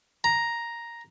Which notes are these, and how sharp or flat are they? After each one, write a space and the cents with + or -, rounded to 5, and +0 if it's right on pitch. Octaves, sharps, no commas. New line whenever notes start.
A#5 +5